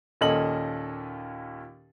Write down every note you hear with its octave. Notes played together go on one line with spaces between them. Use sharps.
D#2 A#2 C#4 A4 D#5 F#7